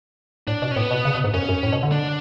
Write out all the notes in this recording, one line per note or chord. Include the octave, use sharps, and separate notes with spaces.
A2 D4
B2
C#4
A2 B3
B2
C#3
B2
G#2
F#2 C#4
F#2
A2
B2
D3
D4